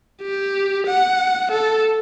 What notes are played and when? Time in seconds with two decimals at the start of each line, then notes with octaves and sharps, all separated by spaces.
0.21 G4
0.87 F#5
1.51 A4